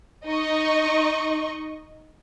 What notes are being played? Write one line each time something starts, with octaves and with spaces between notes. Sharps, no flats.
D#4 D#5 C#6